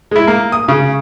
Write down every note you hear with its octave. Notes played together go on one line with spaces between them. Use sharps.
G#3 E4
A#3
D#6
C#3